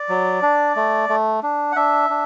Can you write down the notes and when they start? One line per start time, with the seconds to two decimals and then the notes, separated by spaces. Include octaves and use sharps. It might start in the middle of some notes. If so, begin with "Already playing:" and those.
Already playing: D5
0.09 F#3
0.42 D4
0.76 A3
1.09 A3
1.43 D4
1.72 F#5
1.76 D4 E5
2.10 D4